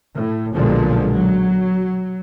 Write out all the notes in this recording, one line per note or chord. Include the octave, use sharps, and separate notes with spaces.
A2
B1 A#2 D3 F3 G#3
F#3